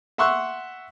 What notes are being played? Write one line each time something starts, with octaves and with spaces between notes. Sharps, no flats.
E5 F#5 C6 C#6 E6 F#6